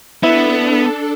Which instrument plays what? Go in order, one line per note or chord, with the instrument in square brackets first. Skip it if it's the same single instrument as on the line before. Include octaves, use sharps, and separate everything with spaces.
[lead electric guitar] B3 [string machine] D4 A4 [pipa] E4